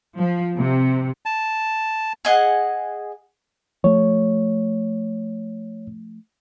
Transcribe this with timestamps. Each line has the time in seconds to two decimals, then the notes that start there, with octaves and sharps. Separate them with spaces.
0.18 F3
0.57 C3
1.26 A5
2.25 G#4 D#5 F#5
3.84 F3 A3 C#5